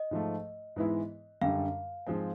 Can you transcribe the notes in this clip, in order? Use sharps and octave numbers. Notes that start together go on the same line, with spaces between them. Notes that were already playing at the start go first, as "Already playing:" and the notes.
Already playing: D#5
G#2 F3 A3
G#2 E3 G#3 B3 E4
F#2 D3 G3 F5
G#2 F3 G#3 C4